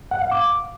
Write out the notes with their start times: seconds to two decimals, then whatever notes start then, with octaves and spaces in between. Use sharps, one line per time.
0.11 F#5
0.21 F5
0.31 D6